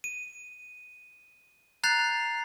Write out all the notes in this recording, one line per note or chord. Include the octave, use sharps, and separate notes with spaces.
D#7
A#5 F#6 G6 A6 C7 F7